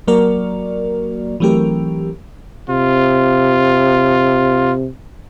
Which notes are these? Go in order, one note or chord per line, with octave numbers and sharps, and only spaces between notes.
F#3 A#3 F#4 A#4 D5
E3 F#3 A3 C4 G4 A#4
C3 F4